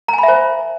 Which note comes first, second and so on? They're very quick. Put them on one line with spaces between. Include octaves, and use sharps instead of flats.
A#5 G#5 B5 E5 C5